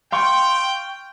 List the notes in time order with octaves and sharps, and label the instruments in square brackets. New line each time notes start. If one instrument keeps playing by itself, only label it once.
[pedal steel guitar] F5 C6 C#6 [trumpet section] G5